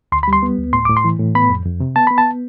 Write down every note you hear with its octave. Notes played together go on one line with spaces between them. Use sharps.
D2 C6
B5
G3
C6
B3
D2
A2 C6
A2 D6
C6
E3
A2
B3 B5
F2
F2
C3
B3 A5
B3 B5
A5